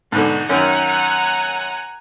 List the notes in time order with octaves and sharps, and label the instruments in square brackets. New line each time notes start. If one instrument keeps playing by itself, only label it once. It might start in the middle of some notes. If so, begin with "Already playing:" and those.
[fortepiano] G#2 B2 D3 [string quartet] D#4 F#4
[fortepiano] F#2 D#3 C#4 [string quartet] F#5 G#5 A#5